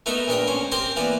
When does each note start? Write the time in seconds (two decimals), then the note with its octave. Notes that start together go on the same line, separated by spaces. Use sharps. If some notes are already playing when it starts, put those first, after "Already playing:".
0.06 A3 B3 D#4 A#4 E5
0.28 A#1 B3 A#4 G5
0.47 C#4 C5
0.72 C4 G4 A#4 C5 G5 C6
0.96 E3 A#3 B3 D5